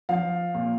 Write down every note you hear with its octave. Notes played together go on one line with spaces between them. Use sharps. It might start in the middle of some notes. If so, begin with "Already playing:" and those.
F3 F5
A#2